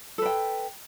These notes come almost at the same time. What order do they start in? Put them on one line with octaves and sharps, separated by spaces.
A4 B4 G5